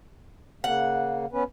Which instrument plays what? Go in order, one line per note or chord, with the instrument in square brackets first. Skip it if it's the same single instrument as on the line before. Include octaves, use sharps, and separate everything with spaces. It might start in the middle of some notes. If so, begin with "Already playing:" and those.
[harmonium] C#3 A#3 [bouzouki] F#5
[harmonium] B3 C#4 B4